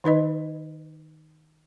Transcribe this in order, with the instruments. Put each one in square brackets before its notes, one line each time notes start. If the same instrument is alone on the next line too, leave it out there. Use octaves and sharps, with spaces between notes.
[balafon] D#3 D#4 B4 D#5